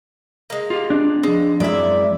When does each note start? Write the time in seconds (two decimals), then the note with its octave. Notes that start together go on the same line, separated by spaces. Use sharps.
0.50 G#3 A#3
0.70 F4 G4
0.90 C4 D4
1.23 F3 G#3 C4
1.60 F#2 G#3 E4 D5 E5